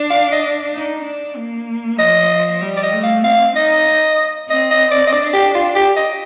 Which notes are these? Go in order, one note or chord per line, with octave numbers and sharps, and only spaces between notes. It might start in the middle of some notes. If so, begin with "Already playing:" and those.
Already playing: D4
F5
D#5
D#4
D4
A#3
F3 D#5
G3
D5
D#5
A3
F5
C4 F5
D#4 D#5
C4 D#5
D#5
D5
D#5
D4 D5
G4
F4
G4
D#5